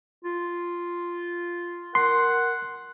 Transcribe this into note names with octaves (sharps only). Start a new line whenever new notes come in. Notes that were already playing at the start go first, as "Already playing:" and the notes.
F4
A#4 F#5 C6